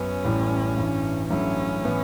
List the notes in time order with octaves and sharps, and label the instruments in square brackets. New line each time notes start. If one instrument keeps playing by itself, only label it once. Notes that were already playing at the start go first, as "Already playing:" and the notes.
Already playing: [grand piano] F#2 B3 [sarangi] C#4
[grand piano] A1 A2 G3
A1 G2 E3
[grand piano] A1 G2 F#3 A3 E4 [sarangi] C#4
[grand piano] A2 E3 B3